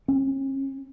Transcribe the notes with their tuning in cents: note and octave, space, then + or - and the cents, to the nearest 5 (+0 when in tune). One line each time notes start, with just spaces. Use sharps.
C#4 -40